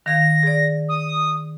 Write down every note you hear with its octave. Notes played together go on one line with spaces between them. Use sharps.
D#3 F5 G#6 A#6
G#4 D5
D#6